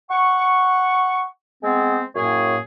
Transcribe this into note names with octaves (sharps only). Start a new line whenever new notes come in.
F#5 C#6
G#3 B3 C4
F#2 A2 A#3 G#4 C#5